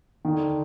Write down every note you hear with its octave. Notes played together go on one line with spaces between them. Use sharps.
D3 D#3